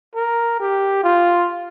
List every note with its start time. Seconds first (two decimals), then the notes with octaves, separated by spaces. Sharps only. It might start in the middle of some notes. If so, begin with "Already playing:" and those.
0.16 A#4
0.60 G4
1.04 F4